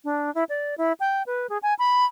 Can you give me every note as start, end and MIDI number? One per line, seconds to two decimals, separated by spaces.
0.04 0.33 62
0.35 0.44 64
0.49 0.75 74
0.78 0.93 64
1.00 1.23 79
1.26 1.47 71
1.49 1.58 68
1.63 1.74 80
1.79 2.05 83